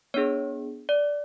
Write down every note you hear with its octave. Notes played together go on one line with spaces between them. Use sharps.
B3 D4 G#4 C#5
D5